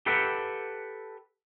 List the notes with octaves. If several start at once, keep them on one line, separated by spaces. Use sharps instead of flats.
G4 A4 B4 E5 F#5 G5